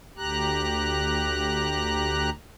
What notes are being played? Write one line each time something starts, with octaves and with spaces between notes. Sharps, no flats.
D2 G4 A#5 F#6